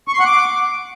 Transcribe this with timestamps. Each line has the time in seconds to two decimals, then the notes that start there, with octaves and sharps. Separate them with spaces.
0.08 C#6
0.14 C6
0.19 F#5
0.25 D6